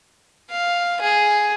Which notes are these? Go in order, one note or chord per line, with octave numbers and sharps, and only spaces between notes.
F5
G#4